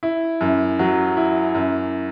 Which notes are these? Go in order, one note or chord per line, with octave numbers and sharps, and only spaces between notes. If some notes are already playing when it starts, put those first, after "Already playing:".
E4
F#2
F#3
E4
F#2